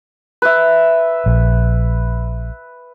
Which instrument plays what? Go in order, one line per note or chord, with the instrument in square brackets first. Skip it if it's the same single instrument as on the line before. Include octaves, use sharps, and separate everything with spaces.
[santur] B4 E5
[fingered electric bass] A#1